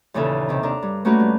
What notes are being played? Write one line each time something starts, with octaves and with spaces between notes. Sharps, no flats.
D#2 A#2 C#3 E3 A4
C3 D#3
D4 A#4
G2
A3 A#3 C#4 F#4 A#4 B4
G2